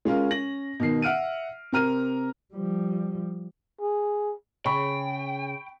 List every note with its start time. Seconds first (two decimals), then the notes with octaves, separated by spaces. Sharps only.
0.05 G#3 C#4 F4 A#4
0.31 C#4 A#6 F#7
0.80 B2 D#3 C7
1.02 E5 F#5 F6 D7 D#7
1.72 C3 C4 A#4 A#5 F6 D#7
2.54 F3 G3
3.81 G#4
4.66 C#3 G5 B5 C#6